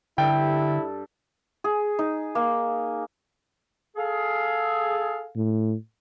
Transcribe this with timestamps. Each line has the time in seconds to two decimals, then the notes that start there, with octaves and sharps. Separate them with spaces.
0.18 G2 D3 E4 A4 G5
1.64 G#4
1.99 D#4
2.35 A#3
3.96 G#4 A4 F5
5.36 A2